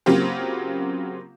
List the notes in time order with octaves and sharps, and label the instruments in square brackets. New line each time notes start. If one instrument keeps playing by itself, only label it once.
[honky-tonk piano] C#3 F#3 A#3 C4 F4 G4